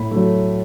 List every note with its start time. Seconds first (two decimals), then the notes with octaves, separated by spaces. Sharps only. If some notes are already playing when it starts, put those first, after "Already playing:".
Already playing: A2 B5
0.11 F#3 A3